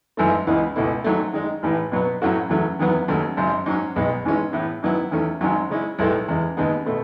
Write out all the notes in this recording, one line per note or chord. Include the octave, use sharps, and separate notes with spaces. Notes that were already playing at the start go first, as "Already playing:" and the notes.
G#1 F#2 E3 A3
C#2 C#3 E3 B3 D#4
C#2 B2 A3 E4
G#2 D#3 F#3 A3
D#3 G#3 D#4
A1 A2 E3
B2 F#3 B3
A2 F#3 C#4 F#4 A4
E2 C#3 F#3 A3 C#4
E2 D#3 F#3 B3
D#2 C#3 F#3 A3 C#4
G#1 F#2 C#3
G#2 F#3 C#4
B1 B2 G#3 D#4
G#1 G#2 E3 G#3 C#4
A2 E3 B3
G#2 D#3 F#3 B3 E4
E2 D#3 A3 C#4
G#1 G#2 D#3 F#3 C#4
C#3 G#3 C#4 E4
B1 A2 G#3 D#4 A4
E2 C#3 G#3
D#2 C#3 G#3 B3 D#4
B2 A3